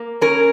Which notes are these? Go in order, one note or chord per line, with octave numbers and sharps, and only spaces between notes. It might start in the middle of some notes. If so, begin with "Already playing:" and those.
Already playing: A#3
C#4 A#4